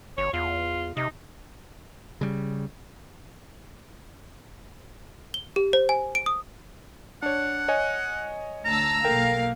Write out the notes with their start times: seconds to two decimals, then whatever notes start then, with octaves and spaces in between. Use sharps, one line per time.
0.18 G1 C#5
0.34 E2 F4
0.97 C3 D#4
2.21 C#3 G3
5.34 G7
5.56 G4
5.73 C5
5.89 G#5
6.15 D7
6.26 D#6
7.22 D4 C#5 F#5
7.68 C#5 D#5 G#5
8.65 D2 A5 A#5 E6
9.04 B1 A#3 A4 A#4 F5 G5